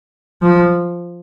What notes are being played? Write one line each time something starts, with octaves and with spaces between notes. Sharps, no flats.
F3